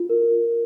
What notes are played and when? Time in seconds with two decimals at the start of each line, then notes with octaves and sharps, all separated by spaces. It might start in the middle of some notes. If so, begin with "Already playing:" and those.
Already playing: F4
0.09 A#4